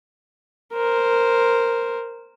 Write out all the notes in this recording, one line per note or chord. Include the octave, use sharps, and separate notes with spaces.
A#4 C5